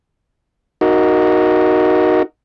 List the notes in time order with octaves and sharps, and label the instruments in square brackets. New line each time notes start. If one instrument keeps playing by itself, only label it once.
[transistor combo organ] D#4 F#4 A#4